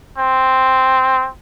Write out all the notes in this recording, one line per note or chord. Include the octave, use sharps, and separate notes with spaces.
C4